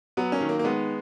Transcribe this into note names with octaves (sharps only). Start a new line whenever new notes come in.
F#3 B3
A#3 C#4
D#3
A#3
A#3
G#3 B3